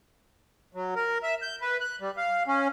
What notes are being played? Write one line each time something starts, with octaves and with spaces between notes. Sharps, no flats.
F#3
A#4
E5
G6
B4
F#6
G3
F5
C#4